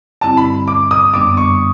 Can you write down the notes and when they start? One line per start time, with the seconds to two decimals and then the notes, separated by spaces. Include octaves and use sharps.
0.21 G2 D3 G3 C4 E4 A5
0.37 B5
0.68 D6
0.91 D#6
1.13 F#2 D3 G3 B3 D4 D6
1.37 C#6